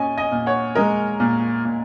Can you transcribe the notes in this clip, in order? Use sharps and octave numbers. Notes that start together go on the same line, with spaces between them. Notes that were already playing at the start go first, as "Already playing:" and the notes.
Already playing: A#2 C#4 D#5 G#5
D#5 G#5
A#2
C#5 F#5
G#3 A#4 D#5
A#2
A#2